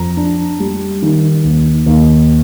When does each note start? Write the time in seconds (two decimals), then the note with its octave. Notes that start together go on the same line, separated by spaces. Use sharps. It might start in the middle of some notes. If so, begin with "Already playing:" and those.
Already playing: F2 A#5
0.17 D4
0.60 G3
1.02 D#3
1.44 D#2
1.86 D#2